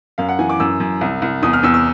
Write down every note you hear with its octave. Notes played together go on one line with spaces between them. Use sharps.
F#2 F5
F#5
E3 G#5
D6
F#2 E6
F#2
C2
C2
E2 D#6
F6
E2 E6
E6